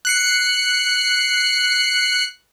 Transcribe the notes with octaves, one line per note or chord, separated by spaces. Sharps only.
F#6 C7 C#7